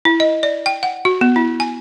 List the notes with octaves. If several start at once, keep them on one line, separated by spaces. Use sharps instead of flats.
E4
D#5
D5
G5
F#5
F#4
B3
E4
G#5